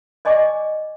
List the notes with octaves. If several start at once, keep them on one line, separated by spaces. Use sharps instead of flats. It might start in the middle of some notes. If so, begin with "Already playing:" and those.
D5 D#5 G#5 C#6 D6